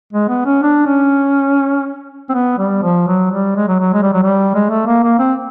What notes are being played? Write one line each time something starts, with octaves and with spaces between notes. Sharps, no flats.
G#3
B3
C#4
D4
C#4
C4
B3
G3
F3
F#3
G3
G#3
F#3
F#3
G#3
G3
F#3
G3
G#3
A3
A#3
A#3
C4